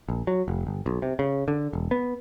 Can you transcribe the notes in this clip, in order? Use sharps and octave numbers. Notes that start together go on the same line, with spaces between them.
A#1
F#3
F1
G1
B1
C3
C#3
D3
E1
B3